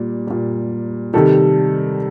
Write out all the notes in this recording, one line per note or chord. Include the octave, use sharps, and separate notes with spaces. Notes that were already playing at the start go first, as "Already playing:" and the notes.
Already playing: A#2 G3
A#2 G3
C3 D#3 G3 A4